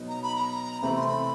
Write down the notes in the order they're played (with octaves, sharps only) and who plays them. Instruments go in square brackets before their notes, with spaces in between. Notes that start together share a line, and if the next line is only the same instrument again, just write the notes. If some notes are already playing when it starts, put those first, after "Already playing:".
Already playing: [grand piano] B2 F#3 B3 D#4
[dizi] A#5
B5
A#5
[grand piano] C3 E3 A3 C4 [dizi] B5
[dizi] C6
B5